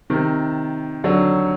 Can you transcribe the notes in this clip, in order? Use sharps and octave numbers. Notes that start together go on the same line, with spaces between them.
C3 D#3
D3 F#3